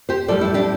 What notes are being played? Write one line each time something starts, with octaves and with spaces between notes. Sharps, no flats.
G4 C5
A2 G3 A4 D5
E4 A4
D4 G4